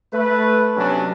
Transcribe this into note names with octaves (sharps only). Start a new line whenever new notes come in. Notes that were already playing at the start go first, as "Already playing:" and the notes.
A3 B4
C3 F#3 B3 C#4 D4